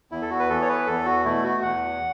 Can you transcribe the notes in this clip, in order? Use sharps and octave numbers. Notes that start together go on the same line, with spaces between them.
E2 E4
A4
F#4
B4
E3 B3 A4
C#5
B4
E2 A4
F#4
B2 A3 E4
F#4
E2 F#5